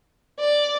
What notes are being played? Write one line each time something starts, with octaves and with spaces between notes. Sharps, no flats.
D5